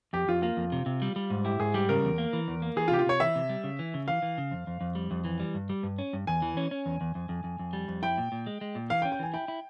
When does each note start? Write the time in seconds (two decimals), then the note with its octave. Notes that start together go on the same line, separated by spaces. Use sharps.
0.13 F2 G4
0.28 F2 F4
0.42 A#3 F4
0.57 F2
0.72 C3
0.86 C3
1.02 G3
1.16 G3
1.30 G#2
1.45 E4 G4
1.60 G#2 G#4
1.74 G3 G4
1.89 C#3 A#4
2.04 E2
2.18 A#3
2.33 E3
2.48 E2
2.62 A#3
2.76 E3 G#4
2.88 F4
2.91 C3 G4
2.99 F4
3.06 C3 C#5
3.20 E3 E5
3.35 C3
3.49 G3
3.64 C#3
3.79 E3
3.94 C#3
4.08 E3 F5
4.22 E3
4.38 C#3
4.51 F2
4.67 F2
4.81 F2
4.95 G3
5.11 F2
5.25 E3
5.40 G3
5.54 G2
5.69 G3
5.83 G2
5.98 C#4
6.13 G2
6.27 E2 G#5
6.42 E3
6.57 C#4
6.71 C#4
6.86 E2
7.01 E2
7.15 F2
7.29 F2
7.44 F2
7.59 F2
7.73 G3
7.88 F2
8.03 E4 G5
8.18 A#2
8.32 A#2
8.47 G#3
8.61 G#3
8.75 A#2
8.90 E3 F5
9.02 G5
9.05 C#4
9.12 G5
9.19 E3 G#5
9.34 E4 G5
9.48 E4